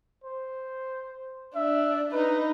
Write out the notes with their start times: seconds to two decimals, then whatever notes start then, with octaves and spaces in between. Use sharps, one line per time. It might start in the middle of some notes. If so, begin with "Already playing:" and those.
0.24 C5
1.55 D4 E5
2.12 D#4 B4